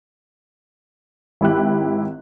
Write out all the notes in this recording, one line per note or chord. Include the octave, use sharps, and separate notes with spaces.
G#1 E4 G4 F#6